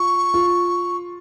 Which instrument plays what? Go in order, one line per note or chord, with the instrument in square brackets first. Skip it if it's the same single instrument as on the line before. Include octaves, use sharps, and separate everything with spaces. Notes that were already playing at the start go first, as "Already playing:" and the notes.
Already playing: [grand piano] F4 [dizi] C#6
[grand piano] F4